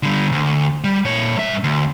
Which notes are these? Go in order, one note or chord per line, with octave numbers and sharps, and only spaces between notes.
D3 G3
D2
G3
A#2 C#5
G2 E5
D2